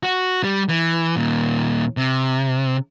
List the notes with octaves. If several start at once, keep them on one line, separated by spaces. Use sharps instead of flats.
F#4
G3
E3
D#2 A#2
C3